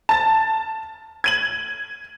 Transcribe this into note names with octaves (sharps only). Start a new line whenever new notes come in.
A5 A6
G#6 D#7 F#7